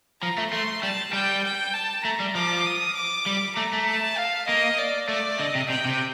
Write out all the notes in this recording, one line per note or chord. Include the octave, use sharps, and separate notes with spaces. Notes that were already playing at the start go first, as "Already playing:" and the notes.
F3 A#5
A3
A3 C6
G3 A5
G3 G5
G5
A5
A3 A#5
G3
F3 D6
D#6
D6
G3
A3 A#5
A3
A5
F5
A#3 D#5
D5
A3 D5
D3 D#5
C3
C3 G5
C3